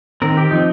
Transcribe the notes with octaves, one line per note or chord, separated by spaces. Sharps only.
D#3 C4 A#4
G4
F3 C4 D#4